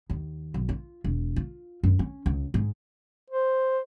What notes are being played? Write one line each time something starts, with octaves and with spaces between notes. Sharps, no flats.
D#2
B1
F4
E1
F4
F#2
C#4
C#2
G#2
C5